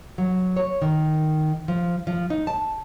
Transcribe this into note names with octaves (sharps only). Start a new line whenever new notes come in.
F#3
C#5
D#3
F3
F3
D#4
A5